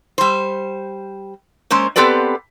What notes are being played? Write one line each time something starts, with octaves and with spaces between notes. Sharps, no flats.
G3 C5
G#3 A#3 C#4 C5
B3 C4 G4 A4 B4 D5